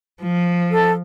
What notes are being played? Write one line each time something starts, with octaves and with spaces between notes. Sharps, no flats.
F3
A4